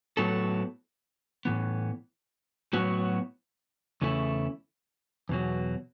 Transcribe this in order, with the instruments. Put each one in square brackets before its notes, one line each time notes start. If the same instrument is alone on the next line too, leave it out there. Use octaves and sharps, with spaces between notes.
[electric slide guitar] A2 F#3 B3 A4
A2 E3 B3
A2 F#3 B3 F#4
E2 C#3 A3 E4
E2 B2 F#3